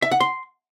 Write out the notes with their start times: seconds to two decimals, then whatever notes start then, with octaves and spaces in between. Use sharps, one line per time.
0.02 E5
0.11 F#5
0.20 C6